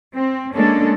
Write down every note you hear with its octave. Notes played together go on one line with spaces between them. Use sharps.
C4
G#3 A#3 C#4 D4 A4